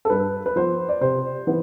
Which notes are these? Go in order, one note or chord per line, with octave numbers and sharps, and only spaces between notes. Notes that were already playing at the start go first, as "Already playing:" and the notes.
A4
G2 B4
B4
F3 B3 C5
D5
C3 C5
E3 B3